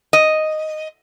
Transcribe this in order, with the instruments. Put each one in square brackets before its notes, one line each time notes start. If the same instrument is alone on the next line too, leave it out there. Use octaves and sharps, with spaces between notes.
[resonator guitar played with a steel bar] D#5